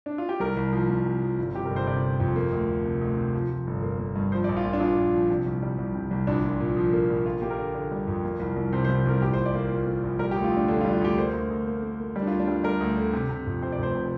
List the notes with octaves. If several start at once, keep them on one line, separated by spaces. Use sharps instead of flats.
D4
F4
G4
C2 A#4
C2
F3
C2
C3
F3
G1
C3 G4
A#4
G1
C5
C3 D5
G1
F2
A#3
D2
D2
C3
D2
C3
F3
F3
G1
A#3
A#3
G2
F3 C5
D5
A#1
F4
A#2
D4
A#1 F4
A#2
F3
C3
C2
G3
C2
C3
C2
A#1 D4
A#2
A#2
F3
A#3
A#1
A#3 F4
A#3 G4
A#4
D3
D3
G3
F2
A#3
C2
C2
C3 C5
C5
C2
C2 A#4
A#1 G4
C5
A#2
D5
A#3 C5
A#2
A#3
A#1
G3 A#4
G4
D2
F4
D2 D4
D3 D4
F4
G3
F4
D2 G4
A#3 C5
D2
D2
A#3
A#3
A#3
G3
D4
F4
D2
D4
G3 F4
G3 A#4
D2
D3
C3
C3
F2
C3 C5
D5
F1 C5
C3